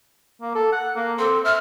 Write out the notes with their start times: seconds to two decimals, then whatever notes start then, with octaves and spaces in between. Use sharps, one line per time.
0.41 A#3
0.55 A4
0.72 F#5
0.96 A#3
1.18 C4 A4
1.45 E5 F6